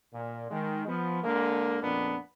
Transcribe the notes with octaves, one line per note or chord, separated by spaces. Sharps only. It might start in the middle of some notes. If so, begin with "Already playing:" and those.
A#2
D#3 G#3
F3 B3
D3 G#3 A#3
F2 A#2 A#3 B3 D4